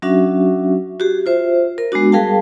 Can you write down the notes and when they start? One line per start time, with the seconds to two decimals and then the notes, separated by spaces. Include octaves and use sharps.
0.02 F#3 C#4 D4 F#4 E5
1.00 F#4 G4
1.26 F4 C5 E5
1.78 A#4
1.92 G#3 B3 D4 F#4
2.12 G3 G#4 A#4 F5 G5 A5